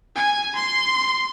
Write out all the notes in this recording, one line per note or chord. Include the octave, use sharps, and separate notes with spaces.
G#5
C6